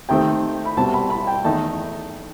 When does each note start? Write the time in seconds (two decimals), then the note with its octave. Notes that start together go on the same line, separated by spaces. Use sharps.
0.09 C3 D#3 A3 C4 G5
0.65 B5
0.77 C2 B2 G3 C4 A5
0.93 B5
1.10 B5
1.27 G5
1.44 E2 D#3 A3 D#4 A5